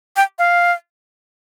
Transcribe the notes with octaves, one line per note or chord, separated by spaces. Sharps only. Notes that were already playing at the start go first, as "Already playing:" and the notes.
G5
F5